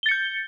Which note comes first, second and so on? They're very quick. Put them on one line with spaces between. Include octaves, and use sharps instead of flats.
G7 A6 C#7 G6